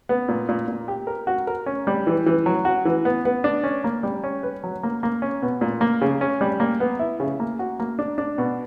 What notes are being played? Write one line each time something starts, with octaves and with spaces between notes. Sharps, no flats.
B3
A#2
A#2
A#2
G4
A#4
F#4
A#4
C#4
G3
E3
E3
F#3
F#4
E3
B3
B3
D4
C#4
A#3
G3
C#4
B4
F#3
A#3
A#3
C#4
B2
A#2
A#3
C#3
C#4
G3
A#3
B3
E4
C#3
A#3
F#4
A#3
D4
D4
B2